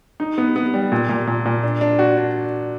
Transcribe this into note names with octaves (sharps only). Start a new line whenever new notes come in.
D#4
B3
B3
G3
A#2
A#2
A#2
A#2
D4
D4
F#4
D4